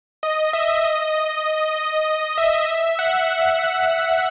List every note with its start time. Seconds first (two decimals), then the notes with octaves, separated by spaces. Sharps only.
0.23 D#5
0.53 E5
0.84 D#5
1.76 D#5
2.38 E5
2.99 F#5